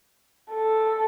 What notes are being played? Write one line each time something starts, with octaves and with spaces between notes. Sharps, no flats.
A4